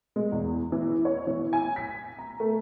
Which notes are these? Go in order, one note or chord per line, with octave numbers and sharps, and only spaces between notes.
G#3
E2
E3
C#5
E3
G#5
B6
A#5
A3